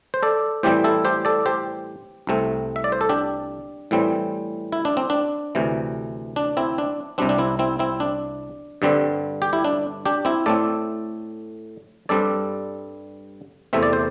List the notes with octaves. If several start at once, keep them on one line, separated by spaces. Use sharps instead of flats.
C5
A4 D5
A2 E3 G3 C4 G4 C5
E4 A4
G4 C5
A4 D5
G4 C5
C2 C3 A3 C4
E5
D5
C5
A4
D4 G4
A2 E3 G3 C4
E4
D4
C4
D4
D2 C3 E3
D4
C4 E4
D4
C2 C3 G3 C4 D4
D4
C4 E4
C4 E4
C4 E4
D4
G2 D3 G3 C4
G4
E4
D4
D4 G4
C4 E4
A2 A3 C4 A4 D5
G2 G3 C4 A4 D5
E2 C3 A3 C4 E5
D5
C5